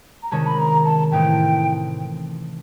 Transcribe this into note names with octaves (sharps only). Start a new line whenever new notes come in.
A#5
C3 D#3 G#3 C#4 A5
B5
A#5
A5
A2 E3 A3 C4 D#4 G5